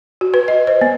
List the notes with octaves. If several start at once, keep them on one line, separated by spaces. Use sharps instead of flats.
F#4
B4
D#5
C5
B3